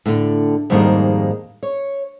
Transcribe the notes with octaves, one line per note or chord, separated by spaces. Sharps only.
A2 D3
F2 G#2 D#3 G3 G#3 A#3
C#5